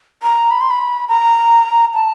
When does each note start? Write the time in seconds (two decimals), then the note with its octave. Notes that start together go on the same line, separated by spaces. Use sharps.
0.23 A#5
0.51 B5
0.61 C6
0.70 B5
1.08 A#5
1.94 A5